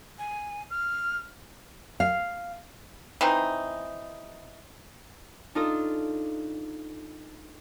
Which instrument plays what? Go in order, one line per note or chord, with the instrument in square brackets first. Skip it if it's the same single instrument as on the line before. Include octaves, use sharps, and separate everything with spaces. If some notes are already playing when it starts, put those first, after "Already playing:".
[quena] G#5
F6
[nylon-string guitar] F5
[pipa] E3 C4 D#4
[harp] D4 D#4 F4 A4 D#5